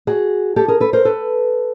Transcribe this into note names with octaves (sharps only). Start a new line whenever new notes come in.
F#4 G#4
G4 A4
G#4 A#4
A4 B4
A#4 C5
A4 B4